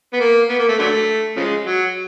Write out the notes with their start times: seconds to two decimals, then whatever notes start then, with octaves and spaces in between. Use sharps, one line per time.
0.13 B3
0.20 A#3
0.49 B3
0.59 A#3
0.68 A3
0.79 D3 F#3 A3
1.36 C#3 F3 G#3
1.66 F#3